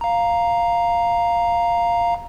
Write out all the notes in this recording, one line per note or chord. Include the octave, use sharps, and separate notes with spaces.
F5 A#5